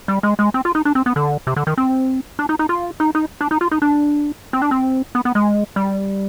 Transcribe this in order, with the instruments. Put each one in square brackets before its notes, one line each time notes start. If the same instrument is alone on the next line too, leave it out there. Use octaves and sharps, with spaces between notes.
[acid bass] G3
G#3
G#3
C4
F4
D#4
D4
C4
B3
D3
C3
D3
D#3
C4
D4
D#4
D#4
F4
D#4
D#4
D4
D#4
F4
D#4
D4
C4
D4
C4
B3
B3
G#3
G3